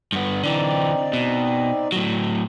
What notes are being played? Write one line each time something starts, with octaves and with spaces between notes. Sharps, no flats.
G2 B3
D3 E3 C4 D#4 D5
B2
A2 F#3